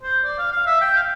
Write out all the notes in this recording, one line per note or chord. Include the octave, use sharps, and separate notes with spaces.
C5
D5
F5
F5
E5
G5
F5